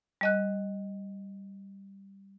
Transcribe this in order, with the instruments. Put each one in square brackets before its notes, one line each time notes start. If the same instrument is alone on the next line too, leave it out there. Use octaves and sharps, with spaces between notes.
[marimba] G3 D#5 F#6